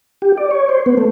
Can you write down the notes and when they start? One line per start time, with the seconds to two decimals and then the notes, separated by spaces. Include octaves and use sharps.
0.22 G4
0.37 D5
0.51 C#5
0.69 C5
0.86 B3
0.98 A3